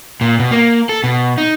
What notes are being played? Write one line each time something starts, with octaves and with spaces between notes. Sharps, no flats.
A#2
B2
A#3
A4
B2
D#4